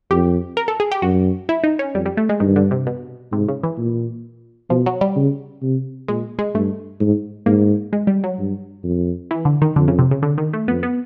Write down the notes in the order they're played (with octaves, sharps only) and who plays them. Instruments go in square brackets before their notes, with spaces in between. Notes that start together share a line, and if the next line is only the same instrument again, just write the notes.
[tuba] F2 [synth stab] G4
[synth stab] A#4
A4
G#4
G4
[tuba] F#2 [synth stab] F#4
[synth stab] E4
D#4
C#4
[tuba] F2 [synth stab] G3
[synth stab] G3
A3
G#3
[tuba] G2 [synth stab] D#3
[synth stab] D3
C3
B2
[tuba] G#2 [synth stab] C3
[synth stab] C#3
E3
[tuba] A#2
[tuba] B2 [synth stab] F3
[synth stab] F#3
G3
[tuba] C#3
C3
[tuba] A#2 [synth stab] G#3
[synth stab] G#3
[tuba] G2 [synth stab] A3
[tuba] G#2
[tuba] G#2 [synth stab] A#3
[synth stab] G#3
G3
F#3
[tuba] G2
F2
[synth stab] E3
D3
D#3
[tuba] F2 [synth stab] D3
[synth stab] C#3
C3
C#3
D3
D#3
A3
[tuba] F2 [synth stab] B3
[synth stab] B3